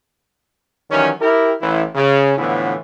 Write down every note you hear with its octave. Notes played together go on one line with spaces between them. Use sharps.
D#3 E3 F#3 G3 C#4
E4 G4 A#4
A1 E3 E4
C#3
A2 D3 E3 F3 B3 E4